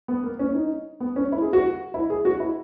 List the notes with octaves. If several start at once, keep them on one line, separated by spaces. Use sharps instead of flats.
B3
A#3
C#4
D#4
B3
C#4
E4
G#4
F#4
E4
G#4
F#4
E4